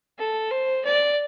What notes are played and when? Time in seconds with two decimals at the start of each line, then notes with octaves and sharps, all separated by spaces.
0.19 A4
0.51 C5
0.85 D5